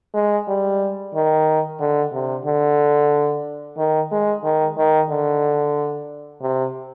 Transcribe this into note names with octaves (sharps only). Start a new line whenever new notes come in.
G#3
G3
D#3
D3
C3
D3
D#3
G#3
D#3
D#3
D3
C3